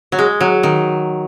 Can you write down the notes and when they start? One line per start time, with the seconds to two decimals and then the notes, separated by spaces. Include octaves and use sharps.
0.12 F#3
0.19 G#3
0.41 F#3
0.63 D#3